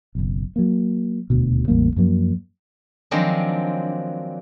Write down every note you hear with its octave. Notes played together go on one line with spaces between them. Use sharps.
F#1 B1
F#3 A#3
D#1 D2 B2
A1 E2 G3 A#3
F#2 F3 F#3 A#3
D#3 F3 F#3 G#3 C4 D4